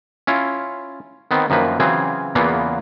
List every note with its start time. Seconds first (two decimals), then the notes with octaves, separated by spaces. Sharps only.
0.27 C#4 E4 F4
1.31 D#3 B3 C4
1.50 F#2 D#3 F3 A#3 B4
1.80 C#3 E3 F#3 C4 F4 G#4
2.35 E2 C#3 E3 A#3 B3 F4